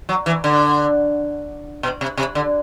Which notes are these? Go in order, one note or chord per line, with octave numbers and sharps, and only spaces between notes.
F#3
E3
D3
B2
C3
C3
D3